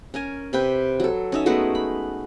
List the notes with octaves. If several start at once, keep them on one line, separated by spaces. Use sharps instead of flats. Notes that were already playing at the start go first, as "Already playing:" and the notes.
C#4 A#4 G#5
C3 G4 B4 G5
F#3 A4
C#4 D#4 E5
G#3 A3 B3 F#4
B5